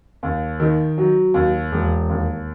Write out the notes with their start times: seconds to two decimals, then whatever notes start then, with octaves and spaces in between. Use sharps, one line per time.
0.23 D#2
0.60 D#3
0.98 F#3
1.34 D#2
1.72 E1
2.09 D#2